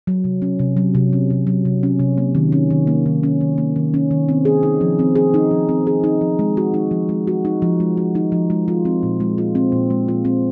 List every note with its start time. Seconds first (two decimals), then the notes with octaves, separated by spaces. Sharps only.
0.07 F#3
0.24 C3
0.42 C#4
0.59 C3
0.77 F#3
0.95 C3
1.13 C#4
1.30 C3
1.47 F#3
1.65 C3
1.83 C#4
1.99 C3
2.18 A#3
2.35 D#3
2.52 C#4
2.70 D#3
2.87 A#3
3.06 D#3
3.23 C#4
3.41 D#3
3.58 A#3
3.76 D#3
3.94 C#4
4.11 D#3
4.29 C4
4.45 G#4
4.63 D#4
4.81 F3
4.99 C4
5.15 G#4
5.34 D#4
5.51 F3
5.69 C4
5.87 G#4
6.04 D#4
6.21 F3
6.39 G#3
6.57 F#4
6.74 D#4
6.91 F3
7.09 G#3
7.27 F#4
7.45 D#4
7.62 F3
7.80 G#3
7.97 F#4
8.15 D#4
8.32 F3
8.50 G#3
8.68 F4
8.85 C4
9.03 A#2
9.20 G#3
9.38 F4
9.55 C4
9.72 A#2
9.90 G#3
10.08 F4
10.25 C4